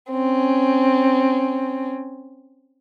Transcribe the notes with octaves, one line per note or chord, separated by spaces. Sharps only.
C4 C#4